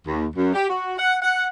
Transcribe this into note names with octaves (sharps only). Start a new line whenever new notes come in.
D#2
F#2
G4
F#4
F#5
F#5